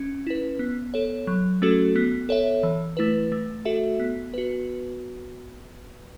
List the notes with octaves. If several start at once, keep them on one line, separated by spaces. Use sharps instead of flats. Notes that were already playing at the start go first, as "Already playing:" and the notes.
Already playing: C#4
E4 B4
B3
A4 C#5
F#3
A3 C#4 F#4 A4
B3
A4 C#5 E5
E3
A3 E4 B4
A3
F#4 A4 E5
B3
F#4 B4